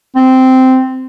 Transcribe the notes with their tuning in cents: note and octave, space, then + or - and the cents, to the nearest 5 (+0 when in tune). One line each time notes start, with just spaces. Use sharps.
C4 -10